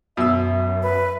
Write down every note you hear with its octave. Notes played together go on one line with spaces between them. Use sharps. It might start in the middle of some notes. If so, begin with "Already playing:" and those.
F#2 B2 E5 E6
B4